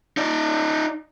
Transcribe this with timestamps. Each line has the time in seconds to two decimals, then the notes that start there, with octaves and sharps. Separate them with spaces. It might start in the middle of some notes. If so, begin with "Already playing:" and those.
0.17 D#4 D5